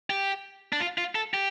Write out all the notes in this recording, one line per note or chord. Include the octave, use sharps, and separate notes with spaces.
G4
D4
F4
F4
A4
G4